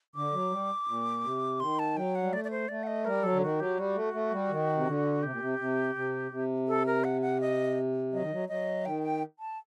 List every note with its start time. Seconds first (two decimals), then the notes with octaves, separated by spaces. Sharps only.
0.15 D3 D6
0.33 F#3
0.51 G3
0.87 A#2
1.24 C3
1.60 D#3 C6
1.79 A5
1.96 F#3 G5
2.15 F#5
2.23 G3
2.33 A3 D5
2.44 D5
2.51 C5
2.68 A3 D5
2.83 F#5
2.87 D#5
3.05 G3 A#4
3.23 F#3 A4
3.33 D3
3.41 D#3 F#4
3.59 F#3 G4
3.77 G3 F#4
3.95 A3
4.13 A3
4.32 G3
4.50 D#3
4.75 C3
4.86 D3
5.23 C3 G4
5.31 A#2
5.40 C3
5.59 C3
5.95 C3
6.31 C3
6.68 A4
6.86 A#4
7.04 F#5
7.21 F#5
7.41 D#5
8.13 F#3 D#5
8.22 D#3
8.32 F#3
8.48 F#3 D#5
8.85 D#3 G5
9.03 G5
9.39 A5